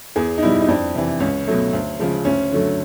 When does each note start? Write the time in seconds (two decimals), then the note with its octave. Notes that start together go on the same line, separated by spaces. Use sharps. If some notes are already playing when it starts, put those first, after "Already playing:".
0.16 E2 G#4
0.38 D#4
0.42 B2 G3 E4
0.62 D#4
0.68 F2 D4
0.95 C3 E3
1.20 C#2 C#4
1.47 B2 F#3 A3
1.73 D2
1.99 C#3 F3 G#3
2.25 D2 C#4
2.52 D3 F#3 A3